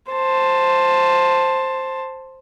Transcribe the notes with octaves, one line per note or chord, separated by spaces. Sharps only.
C5 A5